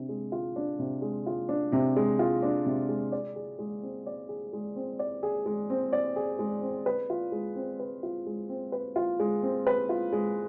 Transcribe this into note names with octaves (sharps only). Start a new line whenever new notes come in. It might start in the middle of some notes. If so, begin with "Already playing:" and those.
Already playing: C3 D4
G#3
F4
D4
C3
G#3
F4
D4
C3
G#3
F4
D4
C3
G#3
D5
G#4
G#3
C4
D5
G#4
G#3
C4
D5
G#4
G#3
C4
D5
G#4
G#3
C4
B4
F4
G#3
C4
B4
F4
G#3
C4
B4
F4
G#3
C4
B4
F4
G#3